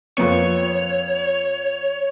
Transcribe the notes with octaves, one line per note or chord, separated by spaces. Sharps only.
F2 A#3 B3 C#5